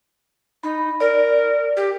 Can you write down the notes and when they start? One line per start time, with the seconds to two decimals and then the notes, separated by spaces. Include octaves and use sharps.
0.63 D#4 B5
1.00 A#4 D5
1.77 G4